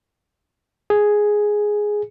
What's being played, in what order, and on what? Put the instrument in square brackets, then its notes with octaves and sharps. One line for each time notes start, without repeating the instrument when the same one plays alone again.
[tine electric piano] G#4